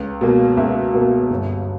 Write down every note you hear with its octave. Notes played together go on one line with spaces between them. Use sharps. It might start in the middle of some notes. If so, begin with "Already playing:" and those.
Already playing: C#2
B2 A#3
C#2 E5
B2 A#3
G1